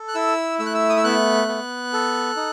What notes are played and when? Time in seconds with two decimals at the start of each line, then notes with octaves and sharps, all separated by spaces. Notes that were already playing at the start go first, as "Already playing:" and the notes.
Already playing: A4
0.08 F#6
0.15 E4 E6
0.59 A3 E6
0.66 F#6
0.74 E6
0.90 D#6
0.96 E6
1.04 B3 F#6
1.48 B3
1.93 A4
2.37 D#4